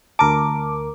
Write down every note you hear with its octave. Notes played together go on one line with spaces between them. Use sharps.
D2 A#4 A5 D6